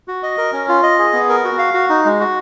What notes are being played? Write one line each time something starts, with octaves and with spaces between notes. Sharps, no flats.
F#4
D#5
A#4
C#4
F4
D#5
G#4
B3
A#4
F#4
F5
F#4
D#4
G#3
F#4